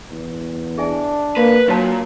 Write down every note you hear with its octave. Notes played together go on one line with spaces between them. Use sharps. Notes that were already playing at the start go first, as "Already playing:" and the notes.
E2
D4 G#4 E5 G#5
A#3 B4
A#2 F#3 D4 C#5 A5